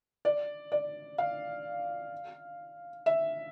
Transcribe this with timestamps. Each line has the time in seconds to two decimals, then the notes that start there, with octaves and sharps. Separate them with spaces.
0.25 D5
0.72 D5
1.18 F5
3.06 E5